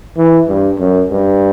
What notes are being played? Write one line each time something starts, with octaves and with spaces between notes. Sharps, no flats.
E3
G2
F#2
G2